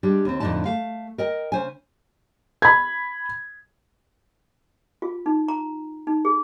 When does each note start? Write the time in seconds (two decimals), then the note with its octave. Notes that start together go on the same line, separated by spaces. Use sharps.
0.03 G3 G#3 D4
0.25 D#2 C4
0.40 F2 A2 D3 D4 D#4 A5
0.66 A3 F5
1.18 A#4 D#5 G5
1.52 C#3 C5 G#5
2.62 B5 G#6
5.02 F4
5.26 D#4
5.48 A#5
6.07 D#4
6.25 G#4